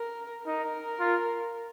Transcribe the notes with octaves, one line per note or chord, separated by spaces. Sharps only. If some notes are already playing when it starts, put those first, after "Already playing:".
Already playing: A#4
D#4 A#4
F4